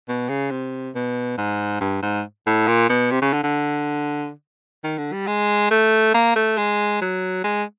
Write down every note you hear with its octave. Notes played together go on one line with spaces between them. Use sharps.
B2
C#3
C3
B2
G#2
G2
G#2
A2
A#2
B2
C3
C#3
D3
D3
D#3
D3
G3
G#3
A3
A#3
A3
G#3
F#3
G#3